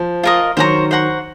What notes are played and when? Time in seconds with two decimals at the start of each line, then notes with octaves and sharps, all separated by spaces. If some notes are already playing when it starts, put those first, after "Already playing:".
Already playing: F3
0.23 F4 A#4 D#5
0.57 D#3 F#3 C5 F#5 A#5 C#6
0.91 C5 F#5 A#5 C#6